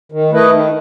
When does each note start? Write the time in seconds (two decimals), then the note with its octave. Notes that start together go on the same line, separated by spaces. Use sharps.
0.12 D#3
0.32 A3 E4 B4 D#5
0.50 D#3